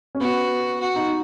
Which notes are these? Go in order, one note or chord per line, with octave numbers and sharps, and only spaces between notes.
C#4
B3 F#4
F#4
D#4